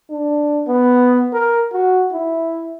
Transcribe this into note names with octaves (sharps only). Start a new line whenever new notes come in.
D4
B3
A#4
F#4
E4